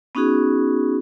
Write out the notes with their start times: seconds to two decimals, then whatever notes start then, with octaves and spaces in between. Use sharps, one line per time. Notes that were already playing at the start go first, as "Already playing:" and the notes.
0.15 B3 C#4 D#4 F#4 G#4